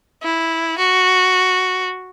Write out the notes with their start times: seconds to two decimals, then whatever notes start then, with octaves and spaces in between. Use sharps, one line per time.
0.23 E4
0.79 F#4